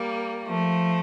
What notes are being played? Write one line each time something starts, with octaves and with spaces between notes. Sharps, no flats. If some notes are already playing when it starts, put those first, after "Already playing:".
Already playing: G3 A#3
F3 A3